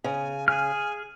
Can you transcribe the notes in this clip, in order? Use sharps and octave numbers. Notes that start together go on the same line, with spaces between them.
C#3 G#5
G#4 G#5 F6